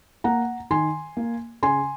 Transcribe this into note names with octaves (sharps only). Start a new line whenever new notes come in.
A#3 F#5 A#5
D#3 G#5 C6
A#3
C#3 G#5 C6